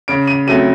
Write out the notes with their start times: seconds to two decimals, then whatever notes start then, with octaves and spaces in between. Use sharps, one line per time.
0.08 C#3 D7
0.28 D#7
0.47 F#3 A3 C4 D#7